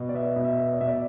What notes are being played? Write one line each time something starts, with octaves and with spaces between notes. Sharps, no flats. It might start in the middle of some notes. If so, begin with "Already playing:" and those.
Already playing: B2
D5
B3 E5
B2
E5
B3
D5
B2 E5
D5